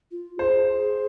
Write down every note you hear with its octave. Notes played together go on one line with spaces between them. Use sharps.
F4
G#4 C5